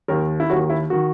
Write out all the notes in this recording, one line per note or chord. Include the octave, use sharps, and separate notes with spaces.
D#2 D#3 A#4
E4
D#2 D#3 F#4
E4
D#3 F#4